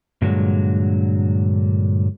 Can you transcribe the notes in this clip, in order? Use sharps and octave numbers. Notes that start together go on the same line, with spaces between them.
G2 A#2 D3 F#3 G#3